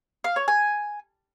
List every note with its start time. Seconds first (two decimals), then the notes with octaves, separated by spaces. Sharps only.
0.24 F5
0.36 C#5
0.48 G#5